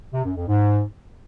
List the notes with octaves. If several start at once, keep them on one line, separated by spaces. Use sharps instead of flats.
C3
F#2
F2
G#2